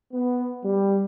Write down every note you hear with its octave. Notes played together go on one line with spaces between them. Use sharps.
B3
G3